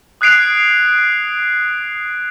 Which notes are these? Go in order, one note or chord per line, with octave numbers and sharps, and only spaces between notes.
D#6 F#6 G#6 C7 D7 F7